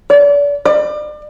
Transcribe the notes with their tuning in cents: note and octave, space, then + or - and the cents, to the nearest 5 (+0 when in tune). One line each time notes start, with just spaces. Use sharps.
D5 -35
D5 +35